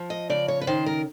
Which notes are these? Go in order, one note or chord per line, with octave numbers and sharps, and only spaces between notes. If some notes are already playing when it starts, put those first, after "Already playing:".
Already playing: F3
D#5
C#3 D5
C#5
B4
D#3 C5
A#4